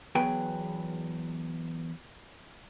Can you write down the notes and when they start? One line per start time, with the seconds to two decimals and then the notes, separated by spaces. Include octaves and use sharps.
0.15 E2 F#3 B3 G#4 B4 G5